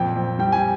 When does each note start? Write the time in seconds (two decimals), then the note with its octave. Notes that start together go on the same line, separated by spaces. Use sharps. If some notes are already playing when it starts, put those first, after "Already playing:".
Already playing: F2 A#2 G5
0.17 F2
0.39 G3 G5
0.52 G#5